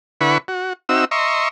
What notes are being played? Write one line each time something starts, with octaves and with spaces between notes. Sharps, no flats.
D3 E4 B4 F#5 B5 C#6
F#4
C4 D#4 F#4 E5 E6
D#5 E5 A#5 C6 C#6